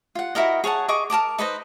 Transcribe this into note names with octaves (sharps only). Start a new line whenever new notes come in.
F4 F#5
E4 F#4 A#4 D#5
G#4 C#5 F#5 A5
G#4 D#5 C#6 D6
A#4 A5 A#5 D6
D#4 B4 C5 D#5